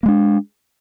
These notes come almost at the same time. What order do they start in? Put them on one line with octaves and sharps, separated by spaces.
A#3 G#3 D4